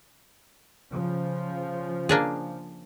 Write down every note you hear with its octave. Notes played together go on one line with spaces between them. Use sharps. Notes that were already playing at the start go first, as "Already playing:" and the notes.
C#3 F3
A#3 D4 G#4